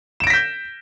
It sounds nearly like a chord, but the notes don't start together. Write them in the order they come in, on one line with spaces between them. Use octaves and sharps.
E7 D7 A#6 B6 G6